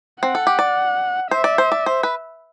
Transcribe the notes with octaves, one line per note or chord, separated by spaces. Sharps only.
C4 F#5
A4
G4
D5
C5 E5
D5
C5
D5
C5
B4